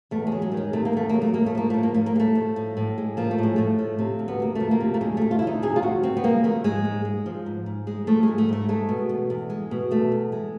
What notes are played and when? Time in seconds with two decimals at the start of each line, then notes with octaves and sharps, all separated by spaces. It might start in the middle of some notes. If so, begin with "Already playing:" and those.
0.11 E2 A3
0.27 G#3
0.32 F#3
0.42 G#3
0.52 D#3
0.57 G#3
0.73 C3 A3
0.85 A#3
0.93 E2 A3
1.09 F#3 A#3
1.22 A3
1.33 G#3 A#3
1.46 A3
1.55 F3 A#3
1.70 A2 A3
1.83 A#3
1.94 A2 A3
2.06 A#3
2.16 G#3
2.20 A3
2.35 F3
2.56 A2
2.77 A2
2.98 G#3
3.17 F3 A#3
3.31 A3
3.38 A2 G#3
3.56 A2 A3
3.79 F3
3.99 C3
4.19 D2
4.28 B3
4.40 D2 A#3
4.55 F3 A3
4.71 A#3
4.81 C3
4.94 A3
5.01 D2 G#3
5.17 D2 A3
5.31 F4
5.39 E4
5.42 F3 D#4
5.62 C3 G#4
5.76 F4
5.82 D2 F#4
6.03 D2 C4
6.17 B3
6.24 G#3 A#3
6.44 F3 A3
6.64 G#2 G#3
6.85 G#2
7.05 G#3
7.26 F3
7.46 G#2
7.66 G#2
7.87 G#3
8.07 F3 A3
8.23 G#3
8.28 G#2
8.38 A3
8.49 G#2 A3
8.69 G#3 A3
8.89 B2
9.09 E2
9.30 E2
9.50 G#3
9.71 B2
9.91 E2 A3
10.12 E2
10.32 G#3